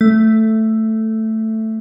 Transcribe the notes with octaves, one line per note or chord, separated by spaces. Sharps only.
A3